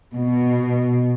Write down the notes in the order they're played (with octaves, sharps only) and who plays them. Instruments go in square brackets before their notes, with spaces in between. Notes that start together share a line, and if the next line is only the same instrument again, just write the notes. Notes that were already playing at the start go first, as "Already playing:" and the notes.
[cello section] B2